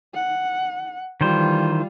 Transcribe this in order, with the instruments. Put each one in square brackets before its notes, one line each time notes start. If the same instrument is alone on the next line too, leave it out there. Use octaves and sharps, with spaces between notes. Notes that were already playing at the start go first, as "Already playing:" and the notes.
[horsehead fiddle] F#5
[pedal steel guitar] D#3 E3 C5 [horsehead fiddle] G3 F4